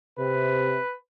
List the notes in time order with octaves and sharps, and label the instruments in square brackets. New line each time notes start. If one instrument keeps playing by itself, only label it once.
[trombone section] C3 [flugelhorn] B4